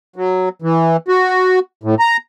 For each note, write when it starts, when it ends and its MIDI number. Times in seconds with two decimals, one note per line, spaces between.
0.16 0.49 54
0.62 0.97 52
1.08 1.59 66
1.83 1.95 45
1.99 2.17 82